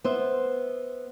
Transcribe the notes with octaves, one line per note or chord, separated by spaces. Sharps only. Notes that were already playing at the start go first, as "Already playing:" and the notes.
B3 C5 E5